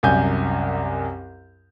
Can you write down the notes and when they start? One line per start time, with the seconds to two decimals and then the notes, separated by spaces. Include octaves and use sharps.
0.03 C2 F#2 G#5 G6